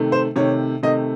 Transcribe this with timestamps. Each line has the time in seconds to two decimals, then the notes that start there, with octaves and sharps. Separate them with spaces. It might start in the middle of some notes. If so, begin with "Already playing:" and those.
Already playing: C3 D#3 A3
0.12 C5
0.36 C3 D#3 A3 C#5
0.83 C3 D#3 A3 D#5